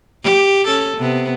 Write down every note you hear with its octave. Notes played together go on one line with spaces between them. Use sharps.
G4
C#4 A4
C3 B3